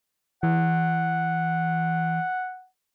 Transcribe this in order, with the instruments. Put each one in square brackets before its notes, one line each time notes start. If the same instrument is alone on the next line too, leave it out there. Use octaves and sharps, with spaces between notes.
[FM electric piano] E3 [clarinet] F#5